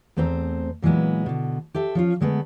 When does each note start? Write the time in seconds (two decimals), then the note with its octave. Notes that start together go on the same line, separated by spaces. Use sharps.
0.17 E2 A3 C4 C5 G#5 A#5
0.82 A#2 E3 F#3 G#3 B3
1.26 B2 D3
1.74 G4 A4 E5
1.95 F3 C#4 F4
2.21 D3 G#3 A3 B3